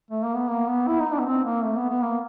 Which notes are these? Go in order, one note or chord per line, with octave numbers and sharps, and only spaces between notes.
A3
A#3
B3
A#3
B3
E4
D#4
D4
B3
C4
A#3
A3
B3
B3
A#3